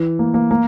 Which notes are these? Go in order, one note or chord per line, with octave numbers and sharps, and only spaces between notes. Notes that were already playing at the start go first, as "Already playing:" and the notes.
Already playing: E3
A#3
A#3
A#3